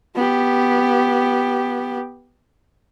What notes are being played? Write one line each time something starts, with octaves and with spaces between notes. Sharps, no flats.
B3 G4